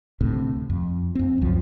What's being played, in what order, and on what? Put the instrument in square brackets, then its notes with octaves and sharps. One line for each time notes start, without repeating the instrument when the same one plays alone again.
[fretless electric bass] D2 A2 C3
F2
F2 C4
C#2 F#2 F3